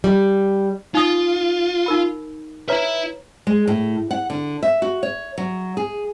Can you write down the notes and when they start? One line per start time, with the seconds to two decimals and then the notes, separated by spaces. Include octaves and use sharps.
0.04 G3
0.95 D#4 F4 D#6
1.86 D#4 A#4 B5
2.69 E4 B4 C#5 E5 A#5
3.47 G#3
3.67 A2
4.11 F#5
4.30 D3
4.63 E5
4.82 F#4
5.03 C#5
5.38 F#3
5.77 G#4